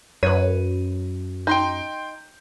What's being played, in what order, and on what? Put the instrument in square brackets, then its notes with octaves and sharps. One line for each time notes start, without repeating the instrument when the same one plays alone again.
[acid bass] F#2 [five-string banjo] B4 C#5 [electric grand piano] D#7
[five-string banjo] D#4 [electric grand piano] G5 C6 G6